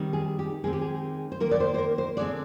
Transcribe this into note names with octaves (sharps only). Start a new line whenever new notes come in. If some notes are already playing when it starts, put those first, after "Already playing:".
Already playing: D#3 G3 C4
G#4
G4
D#3 G#3 C4 G#4
G4
G#4
C5
D#3 A#3 A#4
D5
C5
C5
A#4
C5
D3 G#3 C4 D5